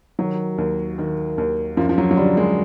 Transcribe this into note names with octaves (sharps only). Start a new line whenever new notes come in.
D#3 F#3
D#2
D#3
D#2
F#2 F3
F3
F#3
F#3
D3 G3
G#3